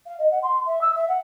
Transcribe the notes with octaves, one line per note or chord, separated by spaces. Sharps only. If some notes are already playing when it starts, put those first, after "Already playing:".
F5
D#5
F#5
C6
E5
E6
E5
F#5